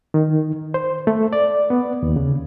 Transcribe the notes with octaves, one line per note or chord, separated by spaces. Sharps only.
D#3
C5
A3
D5
B3
D#2
C#3